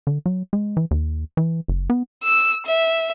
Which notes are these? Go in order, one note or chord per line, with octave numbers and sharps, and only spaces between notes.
D3
F#3
G#3
E3
D#2
E3
F#1
B3
E6
E5